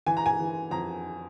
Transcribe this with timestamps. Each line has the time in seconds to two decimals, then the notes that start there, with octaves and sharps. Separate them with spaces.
0.06 E3 G#5
0.17 A#5
0.26 G#5
0.39 E3
0.71 F2 A#5